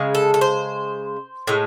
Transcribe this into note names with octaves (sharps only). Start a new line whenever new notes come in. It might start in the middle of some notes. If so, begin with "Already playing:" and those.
Already playing: C#3 G#3
A4
A4
C5
A2 G#3